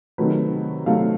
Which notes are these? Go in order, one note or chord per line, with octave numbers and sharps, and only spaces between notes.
C3 D#3 F#3 A3 B4
C3 D#3 F#3 A3 F5